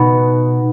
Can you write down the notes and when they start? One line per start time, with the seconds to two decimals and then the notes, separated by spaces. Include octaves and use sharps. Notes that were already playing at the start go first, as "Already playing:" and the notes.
Already playing: B2 B3 D#4